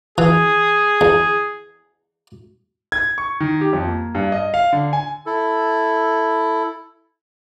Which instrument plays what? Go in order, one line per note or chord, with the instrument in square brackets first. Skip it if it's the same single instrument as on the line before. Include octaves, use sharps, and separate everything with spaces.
[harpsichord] E3 [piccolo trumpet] G#4
[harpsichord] E2
[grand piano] G#6
C#6
D#3
G4
F2
A#3
G2
D#5
F5
D3
G#5
[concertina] E4 A4